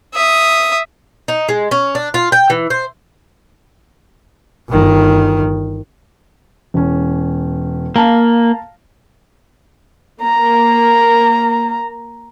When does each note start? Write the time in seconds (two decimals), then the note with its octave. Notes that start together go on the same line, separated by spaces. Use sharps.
0.15 E5 D#6
1.28 D#4
1.49 G#3
1.71 C#4
1.95 D4
2.14 F4
2.32 G5
2.50 E3
2.70 C5
4.69 G1 D#3
6.74 E1 C#4
7.96 A#3 F5 A5 A#5
10.22 A#3 A#5